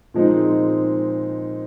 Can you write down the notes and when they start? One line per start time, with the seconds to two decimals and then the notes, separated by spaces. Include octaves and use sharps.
0.14 A#2 F3 G#3 C4 D#4